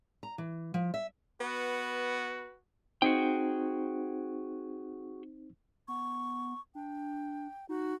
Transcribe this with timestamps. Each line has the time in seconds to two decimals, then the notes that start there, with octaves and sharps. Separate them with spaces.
0.23 A#5
0.38 E3
0.74 F3
0.94 E5
1.41 B3 F#4 B4
3.02 C4 D#4 F#4 G#4 C5 G5
5.88 B3 C#6
6.75 D4 G5
7.69 D#4 F#4